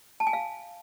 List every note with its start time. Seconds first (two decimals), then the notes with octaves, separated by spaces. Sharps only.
0.20 A5
0.27 G#5
0.33 F5